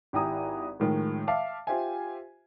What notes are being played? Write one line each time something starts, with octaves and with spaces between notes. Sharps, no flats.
G#1 E4 G4 G#5 A#5 D#6
A2 D#3 F3 G#3
E5 F5 A5 D6
F4 G4 C5 E5 G#5